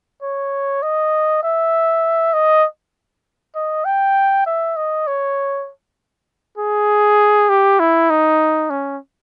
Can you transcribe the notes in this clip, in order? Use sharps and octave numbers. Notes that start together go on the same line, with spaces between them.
C#5
D#5
E5
D#5
D#5
G5
E5
D#5
C#5
G#4
G4
E4
D#4
C#4